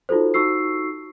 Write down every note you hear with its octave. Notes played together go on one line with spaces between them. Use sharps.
D#4 F4 F#4 A4 C5
D#4 F#4 C#6 E6 C7